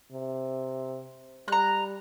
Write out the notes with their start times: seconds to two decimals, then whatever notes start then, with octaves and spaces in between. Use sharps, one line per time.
0.12 C3
1.48 G3 A#5 F#6